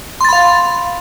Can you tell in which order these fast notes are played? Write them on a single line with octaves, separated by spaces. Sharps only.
C6 A6 B5 F5